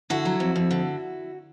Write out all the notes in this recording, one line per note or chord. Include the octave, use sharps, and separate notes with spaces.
D3 E4 F#4
F#3
F2
F2
D3